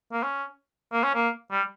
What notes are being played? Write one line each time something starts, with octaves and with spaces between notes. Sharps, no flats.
A#3
C#4
A#3
C#4
A#3
G3